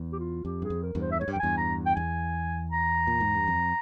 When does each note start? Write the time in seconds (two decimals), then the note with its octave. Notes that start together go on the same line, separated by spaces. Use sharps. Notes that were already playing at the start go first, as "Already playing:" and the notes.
Already playing: E2
0.13 G4
0.19 F4
0.45 F2 G4
0.62 G2 G#4
0.70 F2
0.83 A#4
0.95 E2 G2
1.02 C5
1.12 E5
1.20 G#2 C#5
1.28 G2
1.33 G5
1.36 F2
1.40 E2 G2 G#5
1.58 A#5
1.86 G5
1.96 E2 G#5
2.72 A#5
3.07 A#2
3.20 G#2
3.35 G2
3.48 F2